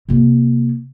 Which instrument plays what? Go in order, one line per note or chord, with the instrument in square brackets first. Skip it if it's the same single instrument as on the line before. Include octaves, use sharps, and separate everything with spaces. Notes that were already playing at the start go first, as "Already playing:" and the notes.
[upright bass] C3 A#3